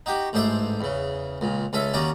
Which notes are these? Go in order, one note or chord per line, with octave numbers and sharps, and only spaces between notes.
D#4 F#4 G4
A1 G#2 D4 C5 E5
E2 C#3
C#2 A#2
C#2 C#4 A4 E5
D#2 D#3 C#4 F#4 D5 A#5